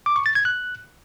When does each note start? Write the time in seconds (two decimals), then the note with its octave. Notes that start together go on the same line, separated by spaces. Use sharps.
0.06 D6
0.16 C#6
0.26 A6
0.35 G#6
0.45 F#6